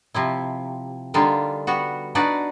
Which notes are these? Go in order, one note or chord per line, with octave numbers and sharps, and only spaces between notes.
C3 F3 E4
D3 G3 A#3 D4 D#4 F4
G3 B3 F#4
D4 D#4 F#4 B4 D5